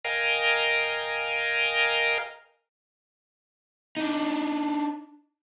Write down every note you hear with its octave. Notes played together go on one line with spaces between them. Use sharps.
A#4 D#5 F5 G5 G#5 A#5
D4 D#4